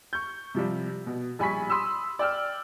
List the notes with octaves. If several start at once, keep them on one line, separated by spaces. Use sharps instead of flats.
C#6 G6
C3 F3 G3
B2
A#1 G3 G#5 B5 C#6 B6
B5 C6 D#6 E6
D5 G5 E6 F6